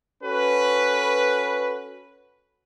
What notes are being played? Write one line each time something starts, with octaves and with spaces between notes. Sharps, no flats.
C#4 F#4 A4 B4